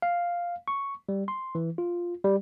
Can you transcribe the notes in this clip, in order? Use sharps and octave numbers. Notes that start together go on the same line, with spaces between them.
F5
C#6
G3
C6
E3
F4
G3